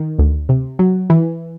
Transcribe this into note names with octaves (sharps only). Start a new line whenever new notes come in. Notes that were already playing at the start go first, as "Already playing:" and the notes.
Already playing: D#3
D2
C3
F#3
E3